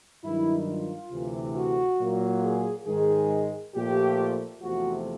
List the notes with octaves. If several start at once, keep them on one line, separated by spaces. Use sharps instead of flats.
G2 D#3 F#3 E4
F4
D2 C3 E3
F#4
A#2 F#3 A#3
G#4
G#2 D#3 G#3 G#4
A#2 F3 A3 G4
E2 C3 F3 A3 F#4